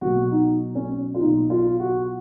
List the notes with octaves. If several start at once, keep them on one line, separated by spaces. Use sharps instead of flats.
B2 F#3 F#4
D#4
C#4
F4
B2 F#3 D#4
F4
F#4